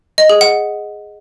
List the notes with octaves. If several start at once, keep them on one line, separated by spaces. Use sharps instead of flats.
D#5
G#4
F#5